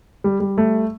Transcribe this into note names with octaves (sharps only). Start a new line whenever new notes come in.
G3
G3
A3